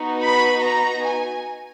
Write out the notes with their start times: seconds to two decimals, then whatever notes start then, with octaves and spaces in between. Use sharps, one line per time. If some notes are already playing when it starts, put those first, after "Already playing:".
Already playing: B3 D#4 F#4
0.23 B5
0.62 A#5
1.03 G#5